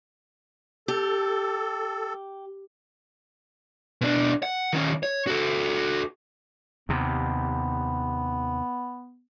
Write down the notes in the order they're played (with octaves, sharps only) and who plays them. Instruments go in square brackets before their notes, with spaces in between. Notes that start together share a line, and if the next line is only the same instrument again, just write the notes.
[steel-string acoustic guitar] G4 [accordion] A4
[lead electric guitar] B2 D4
F#5
D#3 C#4
C#5
F#4 A4
[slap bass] D#2 C3 [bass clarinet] B3